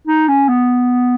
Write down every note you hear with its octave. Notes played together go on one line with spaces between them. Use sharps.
D#4
C#4
B3